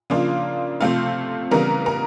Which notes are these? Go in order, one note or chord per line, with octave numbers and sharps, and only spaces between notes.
C#3 F3 A#3 D4 F4
C3 F3 A3 C4 F4 F5
C#3 E3 G3 B3 A#4
A#4